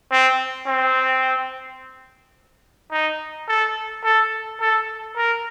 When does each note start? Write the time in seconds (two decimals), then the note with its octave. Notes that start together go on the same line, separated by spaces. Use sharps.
0.11 C4
0.67 C4
2.92 D#4
3.48 A4
4.04 A4
4.61 A4
5.16 A#4